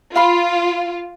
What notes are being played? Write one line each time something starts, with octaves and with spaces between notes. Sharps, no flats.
F4 F5 B5 C6